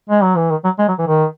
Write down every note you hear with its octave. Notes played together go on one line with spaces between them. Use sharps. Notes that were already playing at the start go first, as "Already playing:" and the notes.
G#3
F#3
E3
D#3
F#3
G#3
F#3
E3
D#3